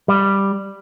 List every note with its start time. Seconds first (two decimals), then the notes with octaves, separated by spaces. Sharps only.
0.08 G3